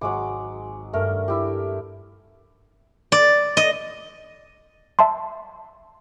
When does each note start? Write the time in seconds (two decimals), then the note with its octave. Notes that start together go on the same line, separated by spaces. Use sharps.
0.01 G#1 F#3 G#3 D6
0.93 G2 A3 A#4 D5 F6
1.28 E4 G4
3.12 D5
3.57 D#5
4.99 E5 A5 C6